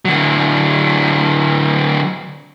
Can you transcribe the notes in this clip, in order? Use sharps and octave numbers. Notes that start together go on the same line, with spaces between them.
D3 F#3